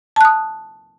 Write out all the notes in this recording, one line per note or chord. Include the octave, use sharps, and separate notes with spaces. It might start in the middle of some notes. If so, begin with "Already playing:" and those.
A5 D#6 F#6